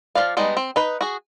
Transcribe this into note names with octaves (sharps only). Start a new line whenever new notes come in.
F3 C4 D5 F5
G3 G#3 B3 D#4
C4
D#4 B4
F#4 G#4